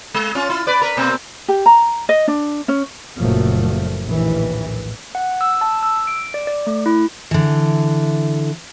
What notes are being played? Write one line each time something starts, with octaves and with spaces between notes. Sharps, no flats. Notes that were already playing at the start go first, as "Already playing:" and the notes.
G#3
C#4 F4
E4 F4
B4 D5
A#4 B4
B2 A#3 C4
G4
A#5
D#5
D4
C#4
F#1 A#2 F3 F#3 A3
A#1 D#2 A2 E3
F#5
E6
A5
E6
D7
D5
D5
A3
E4
D3 E3